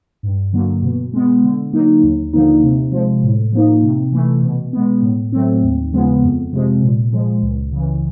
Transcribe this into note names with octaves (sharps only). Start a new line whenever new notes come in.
G2
D3 F#3 A#3
B2
G#3 B3
D3
F#3 A#3 D#4
D#2
D3 F3 A#3 D#4
C3
F3 G#3
A2
F3 A#3 D#4
C3
E3 A3
B2
G#3 B3
A2
F#3 A3 C4
D#2
C#3 F3 G#3 B3
F2
C3 F3 G#3
A#2
F3 G#3
C#2
C#3 E3